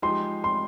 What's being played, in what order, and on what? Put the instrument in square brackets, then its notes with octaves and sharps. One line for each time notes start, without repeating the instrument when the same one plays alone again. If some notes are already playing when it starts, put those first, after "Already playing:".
[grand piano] F3 G#3 D#4 G4 [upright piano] C6
[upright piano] C6